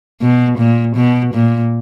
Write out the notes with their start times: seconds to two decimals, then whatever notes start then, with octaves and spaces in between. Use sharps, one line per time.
0.22 B2
0.58 A#2
0.96 B2
1.34 A#2